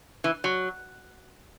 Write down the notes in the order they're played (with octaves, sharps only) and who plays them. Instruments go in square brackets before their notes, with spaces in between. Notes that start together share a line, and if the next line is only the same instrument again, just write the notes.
[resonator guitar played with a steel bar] E3
F#3